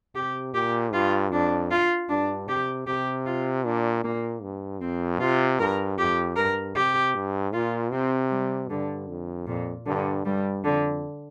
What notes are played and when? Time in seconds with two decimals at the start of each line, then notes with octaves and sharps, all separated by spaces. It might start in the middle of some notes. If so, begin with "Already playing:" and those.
0.15 C3 G4
0.54 A#2 G4
0.93 G2 F4
1.32 F2 D4
1.71 F4
2.09 G2 D4
2.48 C3 G4
2.87 C3 G4
3.26 F4
3.65 A#2 D4
4.04 A#2 A#3
4.42 G2
4.81 F2 C4
5.20 C3 F4
5.59 G2 A#4
5.98 F2 G4
6.36 G2 A#4
6.76 C3 G4
7.15 G2
7.53 A#2 F4
7.92 C3 C4
8.31 G3
8.69 G2 D3
9.09 F2
9.47 F2 A#2
9.86 G2 D3
10.25 G2 G3
10.64 F2 D3